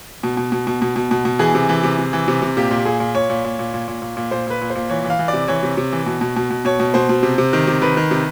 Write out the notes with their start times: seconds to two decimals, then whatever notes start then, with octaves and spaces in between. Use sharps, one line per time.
0.23 B2
0.37 B2
0.52 B2
0.67 B2
0.82 B2
0.96 B2
1.11 B2
1.25 B2
1.39 E3 G#4
1.55 C3
1.69 E3
1.83 C3
1.99 C3
2.13 E3
2.28 C3
2.42 C3
2.57 A#2 G4
2.71 A#2
2.85 A#2 G#4
3.00 A#2
3.15 A#2 C#5
3.30 A#2
3.45 A#2
3.59 A#2
3.74 A#2
3.88 A#2
4.02 A#2
4.17 A#2
4.31 A#2 C5
4.47 A#2 B4
4.61 A#2
4.70 C5
4.75 A#2
4.90 E3 C#5
5.04 E3
5.10 F5
5.19 E3
5.28 D5
5.33 C3
5.48 E3 C#5
5.63 C3
5.77 C3
5.92 E3
6.06 B2
6.21 B2
6.36 B2
6.50 B2
6.65 B2 C#5
6.80 B2
6.94 B2 C5
7.09 B2
7.23 C3
7.38 C3
7.53 D#3
7.67 C3
7.82 D#3 B4
7.97 D#3
8.11 C3